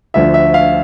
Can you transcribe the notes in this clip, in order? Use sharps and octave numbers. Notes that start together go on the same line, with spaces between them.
D2 D3 F3 E5
E5
F5